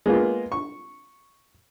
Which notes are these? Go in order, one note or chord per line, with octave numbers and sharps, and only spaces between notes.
G#3 A#3 B3 F4
C#6